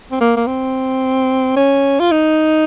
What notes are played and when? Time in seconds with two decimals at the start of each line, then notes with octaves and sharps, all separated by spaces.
0.11 C4
0.20 A#3
0.37 A#3
0.47 C4
1.56 C#4
2.00 F4
2.11 D#4